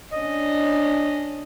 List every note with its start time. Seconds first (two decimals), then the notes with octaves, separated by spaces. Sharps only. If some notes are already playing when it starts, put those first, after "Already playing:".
0.13 C#4 D4 D#5